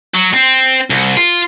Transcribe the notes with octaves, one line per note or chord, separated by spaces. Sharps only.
F#3
C4
C2
F4